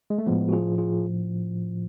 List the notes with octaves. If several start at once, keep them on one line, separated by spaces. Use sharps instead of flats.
G#3
A3
A2 F3 G#3 B3
F#4
F4 G#4
F4 G#4